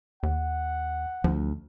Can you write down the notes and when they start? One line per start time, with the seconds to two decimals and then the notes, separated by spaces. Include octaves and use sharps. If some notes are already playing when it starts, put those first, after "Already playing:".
0.23 D#2 F#5
1.24 D2 F3